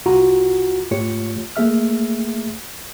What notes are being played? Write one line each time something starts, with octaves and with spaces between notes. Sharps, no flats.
C2 F4 F#4 A#5
G#2 A3 F4 G4 C#5 C#7
A3 A#3 G#4 E5 F6